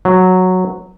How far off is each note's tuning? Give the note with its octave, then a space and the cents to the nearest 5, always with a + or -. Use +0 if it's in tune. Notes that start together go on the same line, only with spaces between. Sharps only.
F#3 -5